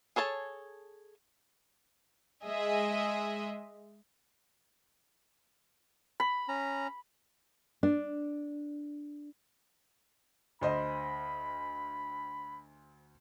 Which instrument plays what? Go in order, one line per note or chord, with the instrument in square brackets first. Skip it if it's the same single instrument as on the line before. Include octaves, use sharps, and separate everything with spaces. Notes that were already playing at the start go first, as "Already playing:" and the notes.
[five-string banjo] G#4 A4 C#5 A5
[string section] G#3 G#4 D#5 E5
[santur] B5
[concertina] C#4 A#5
[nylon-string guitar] D4
[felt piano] D2 C5 D#5 [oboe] B5